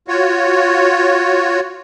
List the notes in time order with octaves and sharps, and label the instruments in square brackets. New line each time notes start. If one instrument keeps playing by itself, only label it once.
[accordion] F4 F#4 C#5